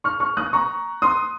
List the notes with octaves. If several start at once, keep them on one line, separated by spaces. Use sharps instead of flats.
C#6 F6
C#6 F6
D#6 F#6
A#5 C#6
C6 D#6